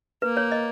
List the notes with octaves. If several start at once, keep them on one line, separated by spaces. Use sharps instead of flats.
A#3 B4
C#5
D#5